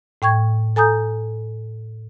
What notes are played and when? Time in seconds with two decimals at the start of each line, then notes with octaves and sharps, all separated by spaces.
0.22 A2 G5 C#6 G#6
0.76 A4 G#5 A#5 D#6 G6